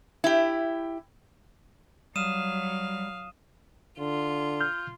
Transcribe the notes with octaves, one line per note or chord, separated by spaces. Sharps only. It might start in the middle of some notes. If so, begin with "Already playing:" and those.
E4 G4
F#3 G3 F5 D#6 D#7 E7
D3 F4
F6 G6